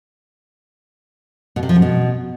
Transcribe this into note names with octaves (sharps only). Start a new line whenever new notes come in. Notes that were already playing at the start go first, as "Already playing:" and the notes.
B2
C3
F3
F#2
B2